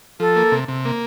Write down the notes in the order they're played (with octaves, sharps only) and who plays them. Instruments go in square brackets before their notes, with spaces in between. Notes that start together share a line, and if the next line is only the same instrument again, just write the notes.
[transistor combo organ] F3 [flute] A4
[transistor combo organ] A#3
C3
C3
A#3